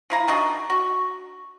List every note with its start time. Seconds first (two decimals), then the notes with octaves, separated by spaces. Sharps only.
0.10 F3 E4 A#5
0.28 D#3 D4 F#4 D#5
0.70 F#4 C#6